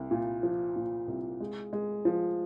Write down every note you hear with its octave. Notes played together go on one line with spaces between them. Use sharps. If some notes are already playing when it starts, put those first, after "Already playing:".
Already playing: C2
A#2
F3
A#2
C2
G#3
G#3
F3